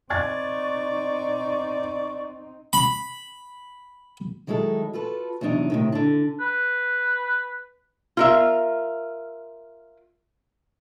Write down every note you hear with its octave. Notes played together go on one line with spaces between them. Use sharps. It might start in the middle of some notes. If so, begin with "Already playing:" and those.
C4 D#4 D5 C#6 F#6 G#6 A6
B5
D#3 F#3 G#3 E4 A4
F4 F#4 A4 B4
E2 C3 F#3 D4 D#4
A2 C3 D#3
D3 D4
B4
F4 A#4 E5